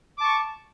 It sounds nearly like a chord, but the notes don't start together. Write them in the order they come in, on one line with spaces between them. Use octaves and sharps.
D6 A5 C#6